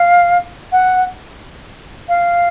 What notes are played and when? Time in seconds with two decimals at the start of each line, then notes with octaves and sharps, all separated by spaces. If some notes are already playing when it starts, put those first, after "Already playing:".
Already playing: F5
0.72 F#5
2.09 F5